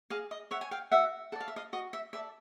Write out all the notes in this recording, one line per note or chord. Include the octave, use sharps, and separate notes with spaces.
G#4 D#5 F5
D#5
C#5 E5 F#5
G#5
F5 G5
F#4 E5 F#5
A4 D5 F5 F#5
E5
D#5 F5
F#4 D#5
E5
A4 D5 E5